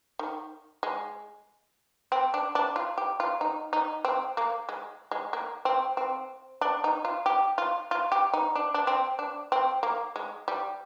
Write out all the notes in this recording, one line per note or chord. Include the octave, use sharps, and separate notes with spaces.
D#3
G#3
C4
D4
D4
F4
G4
F4
D#4
D#4
C4
A#3
G#3
G#3
A#3
C4
C4
D4
D#4
F4
G4
F4
F4
G4
D#4
D4
D4
C4
D4
C4
A#3
G#3
G3